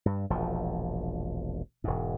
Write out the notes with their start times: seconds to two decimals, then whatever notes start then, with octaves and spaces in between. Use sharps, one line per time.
0.06 G2
0.30 E1 A#1 F3
1.84 E1 G#2